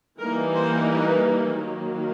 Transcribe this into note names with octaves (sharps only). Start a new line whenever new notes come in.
E3 G3 A#3 D#4 A#4
C5
B4
D#3 F#3 A#3